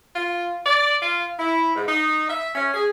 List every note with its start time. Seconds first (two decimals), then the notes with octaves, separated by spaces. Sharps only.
0.15 F4
0.66 D5
1.02 F4
1.39 E4
1.76 G#2
1.88 D#4
2.29 E5
2.55 C#4
2.74 G#4